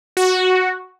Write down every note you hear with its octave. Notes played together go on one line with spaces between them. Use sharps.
F#4